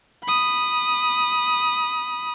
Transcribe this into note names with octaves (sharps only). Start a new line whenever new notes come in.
B5 D#6